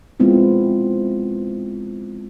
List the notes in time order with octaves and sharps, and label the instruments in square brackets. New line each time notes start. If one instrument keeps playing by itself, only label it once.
[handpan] G#3 B3 C4 E4 F4